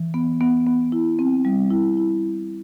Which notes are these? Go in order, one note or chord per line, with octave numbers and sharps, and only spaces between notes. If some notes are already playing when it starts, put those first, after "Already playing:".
Already playing: E3
B3
B3
B3
E4
C4
G3
E4
E4